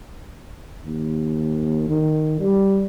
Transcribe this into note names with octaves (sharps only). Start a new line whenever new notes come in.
D#2
D#3
G3